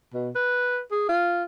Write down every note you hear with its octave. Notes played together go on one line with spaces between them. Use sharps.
B2
B4
G#4
F4